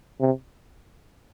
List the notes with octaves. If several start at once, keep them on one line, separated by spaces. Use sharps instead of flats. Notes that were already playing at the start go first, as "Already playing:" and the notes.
C3